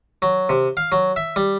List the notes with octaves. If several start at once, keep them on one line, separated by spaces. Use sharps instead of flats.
F#3
C3
F5
F#3
E5
G3